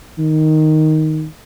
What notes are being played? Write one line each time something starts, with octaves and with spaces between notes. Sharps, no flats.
D#3